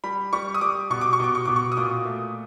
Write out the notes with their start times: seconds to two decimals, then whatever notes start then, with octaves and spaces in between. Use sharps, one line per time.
0.04 G3 B5
0.33 G3 C#6
0.55 D#6
0.61 G3 D6
0.90 B2 C#6
1.01 D6
1.13 C#6
1.19 B2 D6
1.35 C#6
1.45 B2 D6
1.56 C#6
1.72 D#6
1.77 A#2 D6
2.05 A3